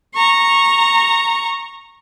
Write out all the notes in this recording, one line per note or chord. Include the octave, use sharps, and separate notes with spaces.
A#5 C#6